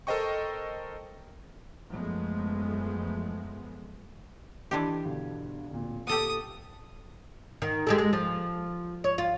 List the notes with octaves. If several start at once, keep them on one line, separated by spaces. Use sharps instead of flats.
A4 A#4 C5 D#5 G5 C#6
F#2 F3 G#3 A3 B3
E3 D4 G4 D#5 C6 G#6
G1 B2 D3
D1 A#2
A#2 G4 A4 F#5 D#6
D#3
G#3 G4 A4
G#3
F3
C#5
F4